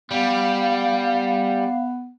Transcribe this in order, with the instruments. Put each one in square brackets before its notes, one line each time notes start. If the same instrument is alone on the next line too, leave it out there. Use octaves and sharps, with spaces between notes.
[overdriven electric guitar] G3 [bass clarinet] B3 [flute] F5